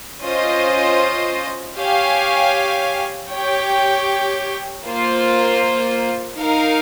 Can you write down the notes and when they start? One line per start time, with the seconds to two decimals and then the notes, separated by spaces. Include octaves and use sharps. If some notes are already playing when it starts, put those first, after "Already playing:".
0.22 C#4 F4 C5 D#5
1.76 G4 C#5 F5 G#5
3.30 G4 C#5 G5
4.84 A#3 F4 C5
6.39 D#4 A#4 F5